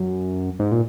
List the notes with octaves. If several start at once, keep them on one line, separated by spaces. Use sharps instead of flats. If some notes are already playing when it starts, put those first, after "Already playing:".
Already playing: F#2
G#2
A#2